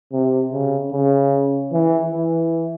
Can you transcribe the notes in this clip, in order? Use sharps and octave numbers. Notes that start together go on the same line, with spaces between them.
C3
C#3
C#3
E3
E3